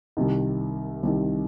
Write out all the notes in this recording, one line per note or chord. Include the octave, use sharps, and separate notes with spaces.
C2 C3 D#3
C2 C3 D#3